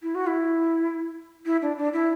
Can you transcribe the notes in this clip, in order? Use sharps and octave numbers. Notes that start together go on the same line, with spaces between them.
E4
F#4
E4
E4
D4
D4
E4